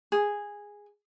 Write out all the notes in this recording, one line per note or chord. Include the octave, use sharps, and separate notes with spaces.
G#4